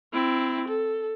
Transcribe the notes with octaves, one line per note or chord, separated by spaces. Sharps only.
C4 E4
A4